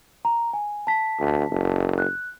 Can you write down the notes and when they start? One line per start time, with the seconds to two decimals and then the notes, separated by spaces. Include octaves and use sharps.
0.25 A#5
0.53 G#5
0.87 A5 B6
1.20 D2
1.51 F#1
1.99 F#6